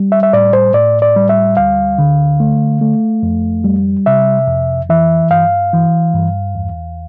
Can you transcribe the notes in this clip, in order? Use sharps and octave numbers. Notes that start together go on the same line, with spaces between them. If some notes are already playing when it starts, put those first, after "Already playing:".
Already playing: G3
E5
E5
A2 D5
C5
A2 D5
D5
G3
E5
D2 F5
D3
A3
A3
F2
G3
C3 E5
F2
E3 E5
G2 F5
E3
G2
E2